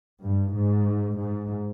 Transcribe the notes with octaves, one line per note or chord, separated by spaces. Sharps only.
G2
G#2
G#2